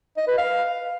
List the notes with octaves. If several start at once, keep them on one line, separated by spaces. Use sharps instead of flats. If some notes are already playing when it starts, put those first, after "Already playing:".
D#5
B4
F5